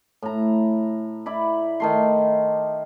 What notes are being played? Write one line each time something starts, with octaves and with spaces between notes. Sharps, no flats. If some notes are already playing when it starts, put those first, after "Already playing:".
A2 A#5
E4 D5 B5
D#3 A3 C6